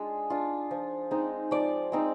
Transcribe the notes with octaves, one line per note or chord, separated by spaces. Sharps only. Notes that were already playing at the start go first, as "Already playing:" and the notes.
Already playing: G#3 D4 F4 G#4
D4 F4
F3
G#3 C4 D#4
F3 D5
G#3 C4 D#4